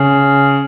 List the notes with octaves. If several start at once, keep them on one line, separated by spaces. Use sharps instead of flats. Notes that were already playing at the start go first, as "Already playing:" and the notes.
Already playing: C#3